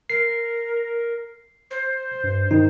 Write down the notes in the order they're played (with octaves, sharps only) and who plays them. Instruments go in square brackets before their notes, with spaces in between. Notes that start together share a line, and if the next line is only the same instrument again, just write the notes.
[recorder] A#4 [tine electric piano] C7
[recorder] C5
[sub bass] G2
[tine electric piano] G2 D#4 [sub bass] D#3